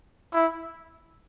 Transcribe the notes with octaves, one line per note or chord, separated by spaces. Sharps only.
E4